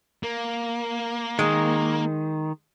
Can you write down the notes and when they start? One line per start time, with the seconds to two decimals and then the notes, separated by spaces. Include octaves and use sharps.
0.23 A#3
1.39 D#3 G#3